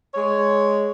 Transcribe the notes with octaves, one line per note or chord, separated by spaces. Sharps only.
G#3 C#5